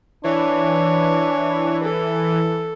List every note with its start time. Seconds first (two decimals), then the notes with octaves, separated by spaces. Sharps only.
0.24 E3 D4 C#5
1.84 A4